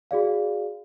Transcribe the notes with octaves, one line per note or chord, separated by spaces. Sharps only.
F#4 G#4 D5 F5